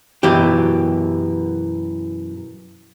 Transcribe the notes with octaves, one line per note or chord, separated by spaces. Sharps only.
F#2 B2 E3 G4